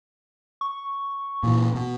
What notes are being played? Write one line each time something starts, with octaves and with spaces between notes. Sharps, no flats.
C#6
A#2 E3
B2